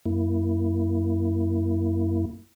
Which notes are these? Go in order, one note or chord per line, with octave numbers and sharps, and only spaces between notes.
F#2 A#3 E4